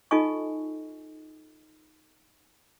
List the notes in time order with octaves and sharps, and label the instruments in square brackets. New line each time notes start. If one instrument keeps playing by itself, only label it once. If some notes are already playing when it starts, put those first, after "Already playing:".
[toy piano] D#4 F4 A4 D#5 G#5 C#6